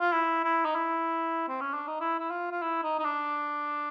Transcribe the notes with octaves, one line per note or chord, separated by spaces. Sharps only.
F4
E4
E4
D#4
E4
C4
C#4
D4
D#4
E4
E4
F4
F4
E4
D#4
D#4
D4